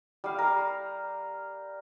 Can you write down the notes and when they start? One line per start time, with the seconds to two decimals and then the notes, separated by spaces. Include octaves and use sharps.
0.24 G3 F5
0.38 A#4